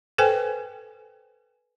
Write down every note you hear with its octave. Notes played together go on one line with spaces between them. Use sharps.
A4 B4 C5 G5 G#5